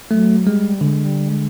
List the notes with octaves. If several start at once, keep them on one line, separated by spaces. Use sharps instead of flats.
F#3 A3
G3 G#3
D3 G#3
G3
G#3